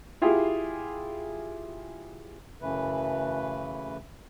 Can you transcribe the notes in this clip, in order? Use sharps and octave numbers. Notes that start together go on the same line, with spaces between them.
E4 F4 G4 G#4
F#2 C#3 E3 A3 B4